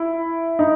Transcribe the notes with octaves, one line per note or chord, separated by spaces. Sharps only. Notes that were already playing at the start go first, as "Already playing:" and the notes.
Already playing: E4
D#4